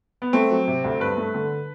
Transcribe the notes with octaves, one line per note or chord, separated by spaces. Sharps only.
B3
A3 C4
F#3
C3
D2
G2 B4
A3
D3